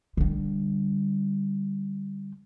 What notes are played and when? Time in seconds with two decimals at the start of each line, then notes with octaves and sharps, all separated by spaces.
0.17 D3 G3